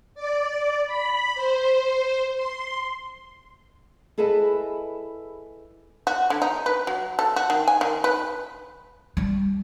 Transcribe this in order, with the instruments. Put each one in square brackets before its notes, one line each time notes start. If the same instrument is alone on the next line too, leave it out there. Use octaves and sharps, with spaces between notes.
[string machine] D5
B5
C5
C6
[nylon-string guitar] E4 G#4 A4 B4 D#5 E5
[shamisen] F#4
D3
D#4
B4
F#3
A4
F#4
D#3
G#5
D#3
B4
[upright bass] G3